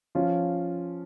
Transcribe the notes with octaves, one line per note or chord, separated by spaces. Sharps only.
F3 C#4 F4